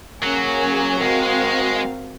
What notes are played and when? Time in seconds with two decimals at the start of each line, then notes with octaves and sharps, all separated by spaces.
0.22 F#3 A#3 C#4 G#4
1.01 G#3 C4 F#4 A#4 F5